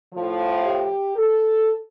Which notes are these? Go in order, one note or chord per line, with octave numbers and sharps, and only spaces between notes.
A2 F3
G4
A4